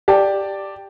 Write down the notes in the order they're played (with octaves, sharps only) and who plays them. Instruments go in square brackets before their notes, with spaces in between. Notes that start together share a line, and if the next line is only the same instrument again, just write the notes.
[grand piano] G4 D5 A5